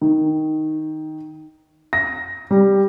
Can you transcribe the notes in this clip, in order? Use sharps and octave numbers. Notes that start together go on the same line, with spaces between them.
D#3
A#6
G3